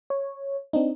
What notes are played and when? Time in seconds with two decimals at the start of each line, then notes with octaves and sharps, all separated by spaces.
0.10 C#5
0.73 C4 D4 D#4